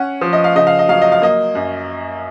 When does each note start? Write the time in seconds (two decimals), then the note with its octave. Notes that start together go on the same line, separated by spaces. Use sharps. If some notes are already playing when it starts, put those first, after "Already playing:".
Already playing: C#4 F#5
0.21 F3
0.33 D#5
0.44 F5
0.55 C#3 D#5
0.67 F5
0.79 D#5
0.89 F#3 F5
1.02 D#5
1.12 F5
1.22 A#3 D#5
1.55 F#2